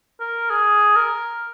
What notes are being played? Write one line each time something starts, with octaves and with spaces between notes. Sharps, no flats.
A#4
G#4
A#4